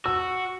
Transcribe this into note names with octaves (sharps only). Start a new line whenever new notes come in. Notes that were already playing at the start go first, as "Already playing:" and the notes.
F#4 E6